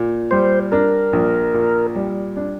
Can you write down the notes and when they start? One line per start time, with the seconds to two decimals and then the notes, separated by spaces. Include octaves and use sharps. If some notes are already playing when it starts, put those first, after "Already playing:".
Already playing: A#2
0.31 G3 C5
0.72 D4 A#4
1.13 A#1
1.54 A#2
1.96 G3
2.37 D4